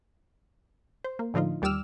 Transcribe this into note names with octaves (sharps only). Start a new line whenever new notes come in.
C5
A#3
A2 D3 F3 D#4 F4
D#2 G3 G4 D6 E6 F6